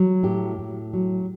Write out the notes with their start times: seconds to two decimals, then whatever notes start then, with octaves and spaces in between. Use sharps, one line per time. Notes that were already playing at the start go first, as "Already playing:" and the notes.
Already playing: F#3
0.23 A2 G4
0.59 A2
0.93 F#3